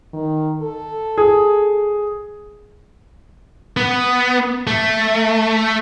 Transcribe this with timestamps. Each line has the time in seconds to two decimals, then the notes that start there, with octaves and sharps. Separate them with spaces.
0.13 D#3
0.62 A4
1.18 G#4
3.77 B3
4.67 A3